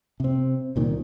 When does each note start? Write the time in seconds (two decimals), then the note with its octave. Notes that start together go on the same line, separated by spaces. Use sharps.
0.20 C3 C4
0.76 C2 A#2 D#3